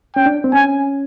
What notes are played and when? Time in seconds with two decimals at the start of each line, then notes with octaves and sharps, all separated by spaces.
0.16 C#4 G5
0.26 D4
0.44 C4
0.53 C#4 G#5